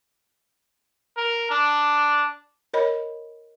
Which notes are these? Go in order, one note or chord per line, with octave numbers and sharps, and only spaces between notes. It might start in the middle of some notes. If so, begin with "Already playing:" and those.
A#4
D4
A#4 C#5 D#5 B5